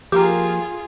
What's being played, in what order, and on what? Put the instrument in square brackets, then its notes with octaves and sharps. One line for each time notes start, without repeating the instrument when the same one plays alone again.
[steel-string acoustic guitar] F3 A#3 [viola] F4 G#4 [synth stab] G4 A#4